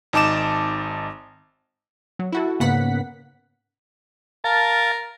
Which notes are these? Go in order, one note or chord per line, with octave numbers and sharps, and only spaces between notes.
G#1 D#4 A5 D6 E7
F#3
E4 F#4 A4
G#2 C#3 A#3 B3 F#5 B6
A#4 F5 A5 A6